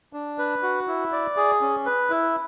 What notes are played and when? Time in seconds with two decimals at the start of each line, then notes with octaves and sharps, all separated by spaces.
0.13 D4
0.38 B4
0.63 F#4
0.88 E4
1.12 D5
1.37 G#4
1.61 C#4
1.86 B4
2.10 E4